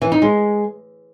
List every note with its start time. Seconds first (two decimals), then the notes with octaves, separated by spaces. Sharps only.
0.02 E3
0.12 D#4
0.22 G#3